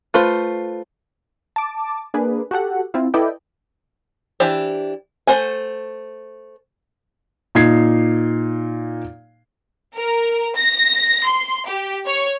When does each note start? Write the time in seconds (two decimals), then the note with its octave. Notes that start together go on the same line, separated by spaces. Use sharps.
0.14 A3 F4 B4 C5
1.56 A5 D6
2.14 A#3 D4 G#4 B4
2.51 F#4 G4 A4 F#5
2.94 C4 E4 F4
3.14 E4 A4 B4 D5 D#5 G5
4.40 E3 D4 E4 G4 C5
5.27 A3 C5 F#5 G#5
7.55 A#2 D#4 G#6 C7
9.97 A#4
10.57 A#6
11.27 C6
11.67 G4
12.07 C#5